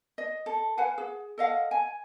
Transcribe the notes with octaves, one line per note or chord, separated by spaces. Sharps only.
D#5
A4
B4 F5 F#5 G#5
G#4
A4 D#5 F5 F#5
G#5